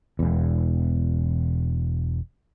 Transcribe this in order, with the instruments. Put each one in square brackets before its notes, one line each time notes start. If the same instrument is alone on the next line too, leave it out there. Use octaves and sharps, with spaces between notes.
[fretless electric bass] E1 E2